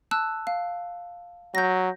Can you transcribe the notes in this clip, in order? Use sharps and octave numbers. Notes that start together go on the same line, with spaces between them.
A5 E6 F#6
F5
F#3 G6 A#6